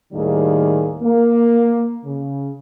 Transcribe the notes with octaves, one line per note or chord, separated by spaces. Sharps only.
D#2 A2 D#3 G3 A#3 G#4
A#3
C#3